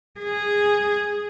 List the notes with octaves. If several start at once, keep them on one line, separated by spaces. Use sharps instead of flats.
G#4